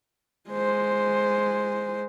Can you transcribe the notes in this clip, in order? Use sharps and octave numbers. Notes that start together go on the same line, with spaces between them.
G#3 C5